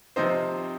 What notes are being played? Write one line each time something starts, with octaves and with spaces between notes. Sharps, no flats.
C3 F3 C4 D#4 C5